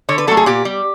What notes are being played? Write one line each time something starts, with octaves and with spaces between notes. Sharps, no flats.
D3 C#5
B4
F#3 A3 A4
G#4
A#2 G4
G3